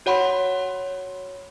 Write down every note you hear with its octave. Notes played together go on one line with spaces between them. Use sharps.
F#4 C#5 F#5 B5 C6